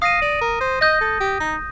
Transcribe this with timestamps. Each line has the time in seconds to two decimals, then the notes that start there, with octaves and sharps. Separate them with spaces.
0.02 F5 D#6 A#6 D#7
0.22 D5
0.41 A#4
0.61 C5
0.81 D#5 D#6 G6 A#6
1.01 A4
1.20 G4
1.40 D#4